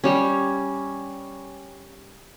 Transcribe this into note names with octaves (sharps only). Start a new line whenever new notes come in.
G3 C#4